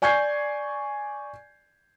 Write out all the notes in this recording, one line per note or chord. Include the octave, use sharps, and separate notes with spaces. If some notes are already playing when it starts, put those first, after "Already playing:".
D5 G#5 C#6 G6 G#6 C7